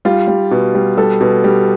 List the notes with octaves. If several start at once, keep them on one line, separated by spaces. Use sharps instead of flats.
G3 F4
G3
B2
G3
G3 A4
B2
G3